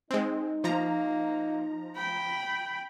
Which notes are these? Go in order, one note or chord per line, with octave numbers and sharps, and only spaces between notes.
G#3 C4 D#4
F3 A#3 A#5
G5 B5